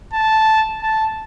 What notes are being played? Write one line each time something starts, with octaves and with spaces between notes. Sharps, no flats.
A5
A5